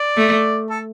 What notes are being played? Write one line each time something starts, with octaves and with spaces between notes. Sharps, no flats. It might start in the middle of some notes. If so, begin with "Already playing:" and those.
Already playing: D5
A3
A4